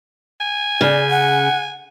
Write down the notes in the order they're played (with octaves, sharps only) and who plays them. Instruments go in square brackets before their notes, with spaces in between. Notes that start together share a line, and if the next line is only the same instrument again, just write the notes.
[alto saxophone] G#5
[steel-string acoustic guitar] C#3 [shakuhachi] D5
[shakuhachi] F#5